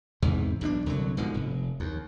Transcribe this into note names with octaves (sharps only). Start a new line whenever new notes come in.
E2 G#2 C3 E3
B1 B2 C#4 D4
C2 D3 D#3 F#3
G#2 B2 D3 F3
F1
D#2